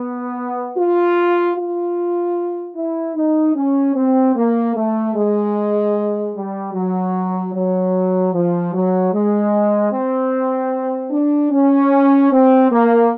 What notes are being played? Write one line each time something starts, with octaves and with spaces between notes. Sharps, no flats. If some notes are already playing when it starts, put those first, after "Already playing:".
Already playing: B3
F4
F4
E4
D#4
C#4
C4
A#3
A3
G#3
G3
F#3
F#3
F3
F#3
G#3
C4
D4
C#4
C4
A#3